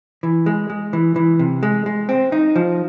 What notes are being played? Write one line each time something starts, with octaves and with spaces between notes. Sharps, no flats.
E3
G#3
G#3
E3
E3
C3
G#3
G#3
C4
D#4
F3